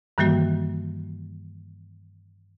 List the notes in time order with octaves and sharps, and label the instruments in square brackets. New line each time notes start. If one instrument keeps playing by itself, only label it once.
[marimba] G2 D#3 E3 G3 A#3 F#4